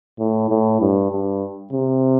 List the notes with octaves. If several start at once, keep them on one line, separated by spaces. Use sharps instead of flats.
A2
A2
G2
G2
C3